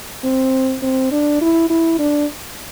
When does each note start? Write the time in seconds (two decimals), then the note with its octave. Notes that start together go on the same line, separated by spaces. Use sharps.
0.24 C4
0.82 C4
1.12 D4
1.41 E4
1.70 E4
1.99 D4